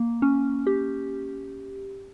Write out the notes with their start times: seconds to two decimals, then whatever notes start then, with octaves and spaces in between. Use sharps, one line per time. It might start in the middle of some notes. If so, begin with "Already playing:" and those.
Already playing: A#3
0.22 C#4
0.67 G4